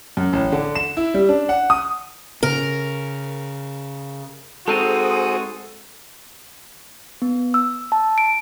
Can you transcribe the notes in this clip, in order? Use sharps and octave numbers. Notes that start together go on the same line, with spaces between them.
F#2
A1
D3
E7
E4
G3
D4
F#5
D#6
C#3 A#4
G#3 C4 D#4 F#4 G#4 A4 C5 D#6
B3
E6
A5
D7